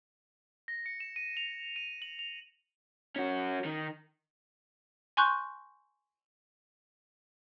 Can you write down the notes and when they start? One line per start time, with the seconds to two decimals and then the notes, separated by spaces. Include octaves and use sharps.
0.68 A#6
0.86 C#7
1.00 E7
1.16 D#7
1.37 F7
1.76 D#7
2.02 F#7
2.19 F7
3.16 C#4 F#4
3.65 D#3
5.17 G#5 C6 C#6 F#6 G6